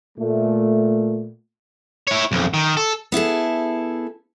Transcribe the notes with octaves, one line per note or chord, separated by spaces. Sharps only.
A#2 A3
E4 C#5
B1 F2
D#3
A4
B3 E4 G#4 A4